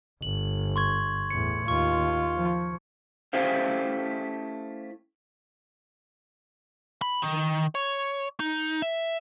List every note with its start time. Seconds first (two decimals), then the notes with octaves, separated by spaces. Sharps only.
0.22 G1 F#7
0.76 C6 C#6 G#6
1.30 E2 A2 C#7
1.68 D#2 F4 C#6
2.35 F3
3.33 A3 C#4 E4 G4 C5 F5
7.02 B5
7.22 D#3
7.75 C#5
8.40 D#4
8.82 E5